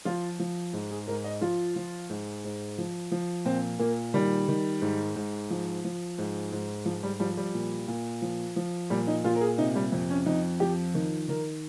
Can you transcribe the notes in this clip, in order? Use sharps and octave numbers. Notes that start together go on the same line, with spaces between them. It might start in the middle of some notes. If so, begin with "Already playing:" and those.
F3 F4
F3
G#2
G#4
G#2 A#4
D#5
F3 F4
F3
G#2
G#2
F3
F3
A#2 C4
A#2 A#3
D#3 G3
D#3
G#2
G#2
F3
F3
G#2
G#2
F3
G3
F3 G3
G3
A#2
A#2
F3
F3
A#2 G3
D#4
A#2 F4
A#4
G#4
C3 D#4
G3
F2
C#4
F2 D#4
F3 G4
D#3
D#3 A#4